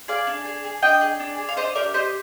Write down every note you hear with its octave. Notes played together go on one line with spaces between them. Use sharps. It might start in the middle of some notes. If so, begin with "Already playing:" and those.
G#4 D5 F5
D4
G#4
G#4
D4 D#5 G5
G#4
D4
G#4
F5
D4 C5 D#5
G4 A#4 D5
G4 C5 D#5